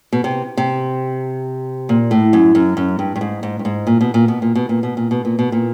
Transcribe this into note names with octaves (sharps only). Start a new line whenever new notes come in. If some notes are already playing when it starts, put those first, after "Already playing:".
B2
C3
C3
A#2
A2
F#2
F#2
F#2
G2
G2
G#2
G#2
G2
G#2
A#2
B2
A#2
B2
A#2
B2
A#2
B2
A#2
B2
A#2
B2
A#2